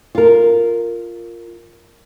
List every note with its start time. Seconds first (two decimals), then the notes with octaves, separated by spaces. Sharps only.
0.15 F4 A#4